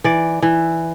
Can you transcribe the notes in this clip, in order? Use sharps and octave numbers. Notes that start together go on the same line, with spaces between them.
E3 D5
E3